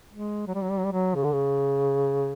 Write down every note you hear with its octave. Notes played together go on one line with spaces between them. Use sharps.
G#3
F#3
G3
F#3
G3
F#3
G3
F#3
C#3
D3
C#3